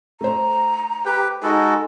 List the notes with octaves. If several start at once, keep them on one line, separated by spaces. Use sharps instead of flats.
A3 C5 A#5
G4 B4 G5
G#3 D#4 F#4 A4 G#5